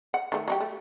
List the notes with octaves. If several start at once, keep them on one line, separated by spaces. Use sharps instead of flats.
F#5
D#3 A3
F#3 D#4 G4
A3